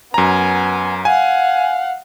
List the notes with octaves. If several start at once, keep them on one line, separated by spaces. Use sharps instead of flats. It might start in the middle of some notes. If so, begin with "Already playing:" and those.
F#2 B3 G#5 A#5
F5 F#5 G#5